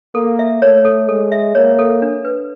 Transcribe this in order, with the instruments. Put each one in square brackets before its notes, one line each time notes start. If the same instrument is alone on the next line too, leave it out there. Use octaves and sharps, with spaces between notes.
[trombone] A#3 [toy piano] A4
[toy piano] E5
[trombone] A3 [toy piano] C#5
[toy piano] A4
[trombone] G#3 [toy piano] A4
[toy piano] E5
[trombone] A#3 [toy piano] C#5
[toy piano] A4
D4
B4